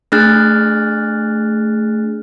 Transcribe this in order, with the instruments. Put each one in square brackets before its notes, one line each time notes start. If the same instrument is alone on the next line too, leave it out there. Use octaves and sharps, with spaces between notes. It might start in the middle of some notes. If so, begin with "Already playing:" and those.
[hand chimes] A3 D4 G#4 F6 F#6 A6